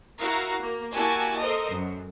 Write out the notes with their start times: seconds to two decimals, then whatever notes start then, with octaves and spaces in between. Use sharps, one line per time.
0.19 E4 F#4 A#4 F5 A#5
0.61 A#3
0.94 A#3 E4 F#4 G4 G#5 A5
1.40 A4 A#4 C5 D#5
1.72 F#2